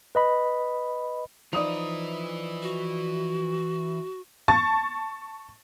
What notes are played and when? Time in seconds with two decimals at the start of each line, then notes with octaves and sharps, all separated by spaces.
0.15 B4 D#5 B5
1.53 E3 F3 D#4 B4 D5 D#6 F7
2.62 F#4
4.48 A5 C#6 A6